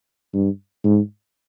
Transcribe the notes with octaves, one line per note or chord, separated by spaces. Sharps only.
G2
G#2